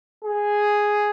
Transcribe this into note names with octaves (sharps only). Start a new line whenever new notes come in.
G#4